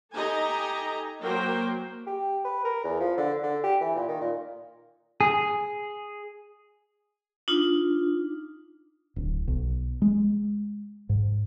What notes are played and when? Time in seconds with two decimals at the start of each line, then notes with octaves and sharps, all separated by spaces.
0.13 D#4 G4 A4 D#5 G#5 A#5
1.22 F#3 A#3 A#4 C5 G5
2.07 G4
2.44 B4
2.65 A#4
2.84 E2
3.00 F3
3.17 D3
3.43 D3
3.63 G4
3.81 E3
3.95 A#2
4.08 D#3
4.21 A#2
5.21 G#4
7.48 D4 D#4 F4
9.16 D1
9.48 B1
10.02 G#3
11.09 G#2